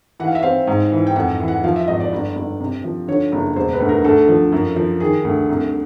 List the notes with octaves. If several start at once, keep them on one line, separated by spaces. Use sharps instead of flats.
E3 F#5
F5
E5
C4 F5
G#2
E3
G5
F2 F#5
E3
F#5
F3 F5
E5
G#1 D#5
D5
G1
G1
C3
F3
D3 C#5
F#1
E1 C5
B4
D2
A#4
D2 A4
F3
F#2
F3
D#3 G#4
D2
C2